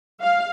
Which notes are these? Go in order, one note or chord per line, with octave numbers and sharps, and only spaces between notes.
F5